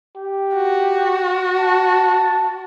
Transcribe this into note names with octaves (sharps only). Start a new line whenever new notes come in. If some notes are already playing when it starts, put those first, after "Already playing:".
G4
F#4
A5